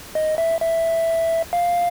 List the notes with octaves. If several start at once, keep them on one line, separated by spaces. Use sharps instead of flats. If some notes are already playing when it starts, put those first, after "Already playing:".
D#5
E5
E5
F5